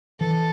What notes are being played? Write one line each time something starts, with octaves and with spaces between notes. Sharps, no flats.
E3 A4